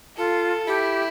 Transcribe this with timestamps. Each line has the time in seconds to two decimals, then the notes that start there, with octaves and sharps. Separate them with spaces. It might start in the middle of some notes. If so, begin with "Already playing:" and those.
0.17 F4 A4
0.67 E4 G4